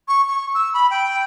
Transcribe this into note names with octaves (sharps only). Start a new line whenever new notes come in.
C#6
C#6
E6
B5
G5